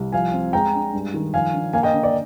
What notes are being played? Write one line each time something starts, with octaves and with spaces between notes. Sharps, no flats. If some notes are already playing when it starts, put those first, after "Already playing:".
Already playing: C2
F3 F5 G#5
C4
G#3 G5 A#5
D4
G2
D#3
F3 F5 G#5
D4
A#3 F5 G#5
D#5 G5
D3
D5